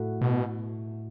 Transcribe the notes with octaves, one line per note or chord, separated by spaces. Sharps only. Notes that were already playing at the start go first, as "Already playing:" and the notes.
Already playing: A2 A3 F#4
B2